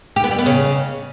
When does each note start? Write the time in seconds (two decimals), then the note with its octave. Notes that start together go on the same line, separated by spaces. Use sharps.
0.16 G4
0.24 B3
0.31 G3
0.39 B3
0.46 C#3